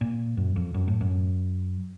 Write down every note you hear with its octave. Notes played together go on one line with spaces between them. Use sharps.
A#2
F#2
F2
F#2
A2
F#2